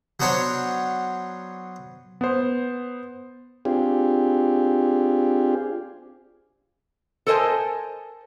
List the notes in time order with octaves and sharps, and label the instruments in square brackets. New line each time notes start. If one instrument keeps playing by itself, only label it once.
[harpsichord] F#3 B3 D4 C5 C#5
[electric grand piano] B3 C5
[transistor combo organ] C4 D4 F4 G4 G#4
[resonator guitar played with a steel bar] A4 A#4 C5 D#5 G#5 A5